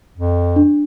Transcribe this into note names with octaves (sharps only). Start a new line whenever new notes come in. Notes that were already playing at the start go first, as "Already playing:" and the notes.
F2
D4